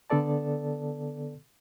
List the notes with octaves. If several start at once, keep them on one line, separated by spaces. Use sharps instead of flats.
D3 B3 A4 D5 A5